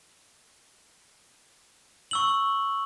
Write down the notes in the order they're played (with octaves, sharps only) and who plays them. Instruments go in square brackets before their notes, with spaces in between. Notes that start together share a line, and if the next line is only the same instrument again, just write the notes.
[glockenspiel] C#6 E6 F#7